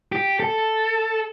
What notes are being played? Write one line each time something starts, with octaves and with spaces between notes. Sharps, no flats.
G4
A4